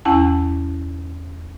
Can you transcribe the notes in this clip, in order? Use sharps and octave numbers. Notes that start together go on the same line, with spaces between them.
E2 C#4 E4 F#5 A5